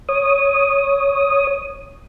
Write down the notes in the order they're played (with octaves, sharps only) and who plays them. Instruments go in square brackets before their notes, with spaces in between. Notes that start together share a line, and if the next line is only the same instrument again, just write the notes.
[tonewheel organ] C#5 D#6